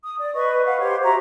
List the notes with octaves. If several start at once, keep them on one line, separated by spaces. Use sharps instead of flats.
D#6
D5
B4 D#5 C#6
B4 F5 F#5
G4 C5 C#5
F#4 E5 A#5